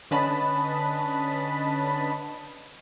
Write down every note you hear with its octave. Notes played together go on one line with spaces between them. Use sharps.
D3 C#4 B4 D#5 A5 B5